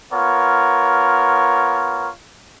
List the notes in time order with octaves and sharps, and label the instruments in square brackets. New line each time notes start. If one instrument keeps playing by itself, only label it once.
[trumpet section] B3 F4 A#4 C#5